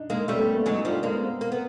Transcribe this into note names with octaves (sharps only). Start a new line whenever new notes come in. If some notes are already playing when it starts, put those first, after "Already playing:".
Already playing: D4 D#4
G#3 A#3
G3 A3 C#4
B3
A#3
B3
F#3 G#3 D#4
D4
F3 G3
A3
G#3 A#3
B3
C4
A#3
B3